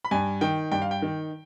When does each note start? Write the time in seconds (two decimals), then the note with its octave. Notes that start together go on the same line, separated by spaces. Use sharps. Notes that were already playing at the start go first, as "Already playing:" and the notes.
0.04 B5
0.11 G2 G#5
0.41 D#3 G5
0.72 G2 G5
0.82 F5
0.91 G5
1.02 D#3